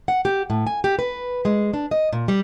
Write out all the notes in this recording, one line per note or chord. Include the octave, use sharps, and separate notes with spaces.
F#5
G4
A2
G#5
G4
B4
G#3
D4
D#5
A#2
G3